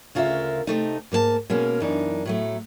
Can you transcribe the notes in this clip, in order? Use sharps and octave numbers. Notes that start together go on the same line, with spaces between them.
D2 C#3 F4 A#4 C5 E5
C3 A3 D#4
G#2 A#3 A#4 A5
B2 G#3 A#3 C#4
F#2 E3 D4 D#4
A2 F#3 A3